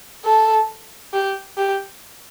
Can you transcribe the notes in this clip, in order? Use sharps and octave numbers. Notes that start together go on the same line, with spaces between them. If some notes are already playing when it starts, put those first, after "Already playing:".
A4
G4
G4